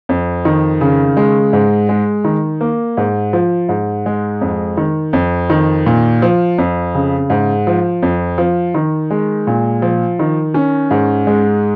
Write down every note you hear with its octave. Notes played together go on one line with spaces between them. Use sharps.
F2
D#3
C#3
G#3
G#2
G#3
D#3
A#3
G#2
F3
G#2
G#3
F2
D#3
F2
D#3
A#2
F3
F2
C#3
G#2
F3
F2
F3
D#3
G#3
A#2
F3
D#3
C#4
G#2
G#3